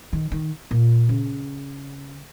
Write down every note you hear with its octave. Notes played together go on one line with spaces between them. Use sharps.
D#3
D#3
A#2
C#3